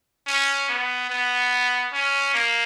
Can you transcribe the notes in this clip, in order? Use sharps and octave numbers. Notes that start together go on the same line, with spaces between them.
C#4
B3
B3
C#4
A#3